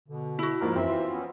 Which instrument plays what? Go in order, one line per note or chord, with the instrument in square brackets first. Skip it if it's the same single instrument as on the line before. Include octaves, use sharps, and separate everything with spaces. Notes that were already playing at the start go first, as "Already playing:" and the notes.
[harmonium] B2 [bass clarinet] D3
[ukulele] E4 F#4
[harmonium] G#2 [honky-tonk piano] F3 A#3 A#4 [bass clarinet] D#4
[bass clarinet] F#2 [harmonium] E3 E5 [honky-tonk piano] C4
[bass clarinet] F4
[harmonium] B3 C#4